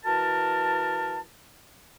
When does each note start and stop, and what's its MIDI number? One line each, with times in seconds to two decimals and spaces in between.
0.05 1.20 52
0.05 1.20 66
0.05 1.20 70
0.05 1.20 81